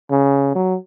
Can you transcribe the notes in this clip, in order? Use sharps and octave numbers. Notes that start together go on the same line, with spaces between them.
C#3
F#3